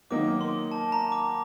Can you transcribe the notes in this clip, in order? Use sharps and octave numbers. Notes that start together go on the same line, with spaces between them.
D#3 F#3 A#3 D#4 D6
C6
A5
A#5
D6